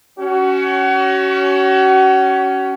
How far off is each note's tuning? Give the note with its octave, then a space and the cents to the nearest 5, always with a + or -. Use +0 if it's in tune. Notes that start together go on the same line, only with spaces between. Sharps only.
C#4 +15 F#4 +35